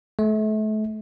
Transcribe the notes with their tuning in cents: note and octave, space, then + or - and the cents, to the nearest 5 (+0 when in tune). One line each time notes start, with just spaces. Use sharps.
A3 -35